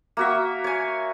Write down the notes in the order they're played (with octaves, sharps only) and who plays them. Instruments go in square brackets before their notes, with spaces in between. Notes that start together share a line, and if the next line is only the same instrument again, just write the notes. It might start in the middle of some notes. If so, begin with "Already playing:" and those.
[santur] A#3 F#4 E5
C#5 G#5